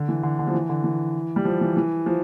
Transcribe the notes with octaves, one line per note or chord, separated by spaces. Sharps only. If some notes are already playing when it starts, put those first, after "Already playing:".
Already playing: D3
E3
D3
D3
F3
E3
D3
E3
G3
F3
E3
E3
F3